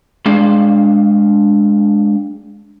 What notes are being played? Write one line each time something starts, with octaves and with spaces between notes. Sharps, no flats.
G#3 D4 F5